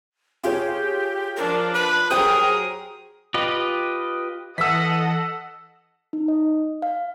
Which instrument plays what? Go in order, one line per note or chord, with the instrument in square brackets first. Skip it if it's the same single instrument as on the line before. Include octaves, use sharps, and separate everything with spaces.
[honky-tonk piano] F4 G#4 C#5 [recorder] G4
[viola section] F3 D4 [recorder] A#4
[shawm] B4 [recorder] F#6
[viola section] F#3 G#4 A#4 [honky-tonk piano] G4 C5 [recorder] G5 [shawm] D#6
[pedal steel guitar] F4 G4 B4 D#5
[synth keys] E3 [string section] A4 D#5 F#5 [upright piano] E6 B6
[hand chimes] D#4
D#5
F5